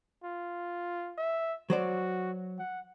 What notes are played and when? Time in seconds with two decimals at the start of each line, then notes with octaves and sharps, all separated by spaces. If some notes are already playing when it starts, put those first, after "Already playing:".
0.24 F4
1.18 E5
1.70 F#3 F#4 C5 D5
2.59 F#5